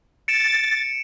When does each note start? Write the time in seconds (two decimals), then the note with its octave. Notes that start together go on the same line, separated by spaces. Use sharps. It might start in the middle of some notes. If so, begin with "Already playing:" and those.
0.28 A6 C#7 D7 E7